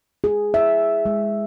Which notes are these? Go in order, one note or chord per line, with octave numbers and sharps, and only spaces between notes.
G#4
E5
G#3